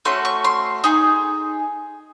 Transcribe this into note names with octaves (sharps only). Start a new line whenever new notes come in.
A3 C#4 F#4 A4 C6
C#6
C6
D#4 G#4